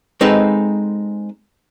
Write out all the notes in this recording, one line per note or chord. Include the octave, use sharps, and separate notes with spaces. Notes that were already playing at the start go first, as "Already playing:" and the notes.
G#3 C4 D#4 A4 B4